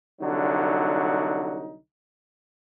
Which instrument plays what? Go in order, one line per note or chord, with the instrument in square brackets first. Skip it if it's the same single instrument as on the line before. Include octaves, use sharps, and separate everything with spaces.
[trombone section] C2 D3 F#3 D#4